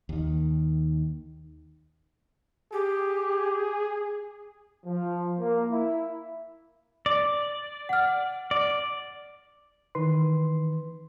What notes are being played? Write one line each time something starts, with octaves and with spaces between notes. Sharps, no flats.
D#2 D#3
G4 G#4
F3
A#3
E4
D5
F#5 F6
D5
D#3 E3 B4 C6